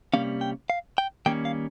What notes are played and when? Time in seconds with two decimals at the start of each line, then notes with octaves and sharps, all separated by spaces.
0.14 C3 G3 A#3 C#4 F5
0.41 G5
0.70 F5
0.98 G5
1.26 D#3 G3 A#3 C#4 G5
1.45 F5